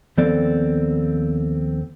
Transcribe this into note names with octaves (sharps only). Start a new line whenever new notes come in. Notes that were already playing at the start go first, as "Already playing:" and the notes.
D#2 F3 B3 C4 A4 D5